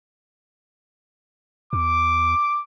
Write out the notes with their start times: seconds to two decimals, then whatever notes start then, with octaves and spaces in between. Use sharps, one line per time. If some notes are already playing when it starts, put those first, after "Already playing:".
1.73 E2 D6